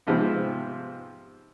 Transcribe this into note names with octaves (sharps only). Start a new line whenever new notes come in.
G#2 C3 F3 G#3 B3 C4